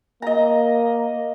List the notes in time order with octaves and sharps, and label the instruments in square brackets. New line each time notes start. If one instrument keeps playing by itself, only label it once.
[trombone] A#3 [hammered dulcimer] D#5 A#5